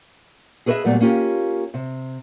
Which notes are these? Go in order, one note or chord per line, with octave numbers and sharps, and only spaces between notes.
G#4 A4 B4 C#5 D#5 E5
A#2 F#3 G3 A3 B3
A#3 C#4 F4 G4
C3